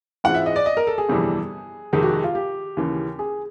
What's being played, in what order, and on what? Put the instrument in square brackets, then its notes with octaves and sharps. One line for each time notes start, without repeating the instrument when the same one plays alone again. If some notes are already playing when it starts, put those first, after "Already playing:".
[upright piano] G#2 E3 G#3 C4 F4 [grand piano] F#5
[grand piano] E5
D#5
D5
D#5
A#4
A4
G#4
[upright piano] G1 F2 C3 E3 G3
[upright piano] F2 C3 D#3 G#3 [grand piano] G4
[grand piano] F#4
G4
F4
G4
[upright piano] D#2 C#3 E3
[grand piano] G#4